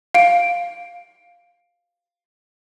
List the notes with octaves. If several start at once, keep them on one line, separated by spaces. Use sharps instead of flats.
F5 D7